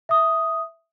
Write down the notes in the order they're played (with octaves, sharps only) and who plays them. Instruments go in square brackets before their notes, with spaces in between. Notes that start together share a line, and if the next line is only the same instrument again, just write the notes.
[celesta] E5 D#6